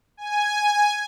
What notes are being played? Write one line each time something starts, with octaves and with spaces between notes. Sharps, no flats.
G#5